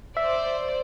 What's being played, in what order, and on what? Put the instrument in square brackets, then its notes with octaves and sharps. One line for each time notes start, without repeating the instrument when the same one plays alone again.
[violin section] C5 D5 [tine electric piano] E5